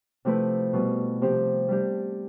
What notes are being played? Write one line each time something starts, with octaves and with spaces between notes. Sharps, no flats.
C3 F3 A3 E4 B4
B2 G3 B3
C3 F3 C4 G4
G3 D4 G4